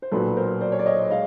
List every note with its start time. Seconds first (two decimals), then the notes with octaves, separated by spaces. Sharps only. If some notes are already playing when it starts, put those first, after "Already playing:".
0.02 C5
0.11 B1 A#2 F#3 A4 B4
0.37 A#4 C5
0.61 C5 D5
0.72 C#5
0.79 D5
0.86 C#5 D#5
1.10 G#3 D#5 F5